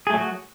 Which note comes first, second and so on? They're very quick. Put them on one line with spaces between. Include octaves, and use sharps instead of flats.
G#4 A3 F#3 F#4